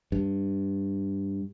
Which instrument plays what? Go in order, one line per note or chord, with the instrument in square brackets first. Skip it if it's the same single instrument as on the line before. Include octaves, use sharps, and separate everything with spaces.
[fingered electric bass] G2